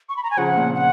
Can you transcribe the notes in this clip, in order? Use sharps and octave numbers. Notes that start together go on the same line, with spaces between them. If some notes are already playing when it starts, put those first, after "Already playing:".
C#6
B5
A#5
G#5
C#3 F3 F#5
A#2 C#3
F#5